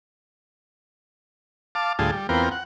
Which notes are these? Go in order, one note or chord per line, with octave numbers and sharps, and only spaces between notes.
F5 A5 D6
D2 A2 G3 F4 G#4 A5
G3
E2 B3 C4 F4 A#4 G5
F#5